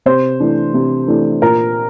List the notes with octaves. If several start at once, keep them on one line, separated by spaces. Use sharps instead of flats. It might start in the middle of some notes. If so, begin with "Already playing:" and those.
C3 C5
E3 A3 D4
C3
E3 A3 D4
A#2 A#4